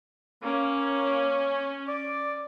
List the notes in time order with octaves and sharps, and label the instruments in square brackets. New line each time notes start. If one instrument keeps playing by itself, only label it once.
[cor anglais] A#3 [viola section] C#4
[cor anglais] D5